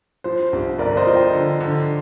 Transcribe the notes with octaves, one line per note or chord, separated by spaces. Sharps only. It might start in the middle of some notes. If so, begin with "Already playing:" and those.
F3 C5
C2
G1 A#4 D5
C5 D#5
F3
D#5 G5
D3
D3